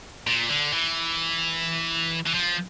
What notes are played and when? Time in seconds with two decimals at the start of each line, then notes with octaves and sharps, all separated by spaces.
0.27 A#2
0.50 D3
0.73 E3
2.26 E3
2.34 F3